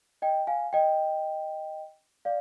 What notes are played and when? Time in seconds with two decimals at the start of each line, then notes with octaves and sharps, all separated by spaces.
0.22 D#5 G5
0.47 F5 G#5
0.73 D#5 G5
2.25 D5 F5